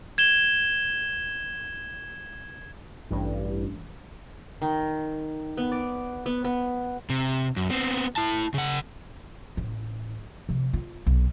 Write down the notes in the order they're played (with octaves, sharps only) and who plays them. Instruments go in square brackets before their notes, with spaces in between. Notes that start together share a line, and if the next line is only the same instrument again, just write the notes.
[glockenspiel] G#6 E7 G7
[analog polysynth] A1 G2
[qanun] D#3
B3
D5
B3
B3
[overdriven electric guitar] C3
F#2
B3 C4
E4 A5
C#3 F#5
[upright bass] A1
C3 F3
F4
B1